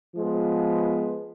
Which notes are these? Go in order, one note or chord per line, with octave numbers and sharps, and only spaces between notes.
F3 G#3 B3